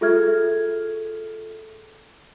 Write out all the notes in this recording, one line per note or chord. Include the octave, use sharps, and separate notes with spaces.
F4 G#4 A4 E5 F6 G#6